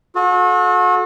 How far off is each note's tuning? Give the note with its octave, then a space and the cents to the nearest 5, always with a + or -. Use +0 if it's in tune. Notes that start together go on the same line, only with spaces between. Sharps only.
F#4 -40 A4 -30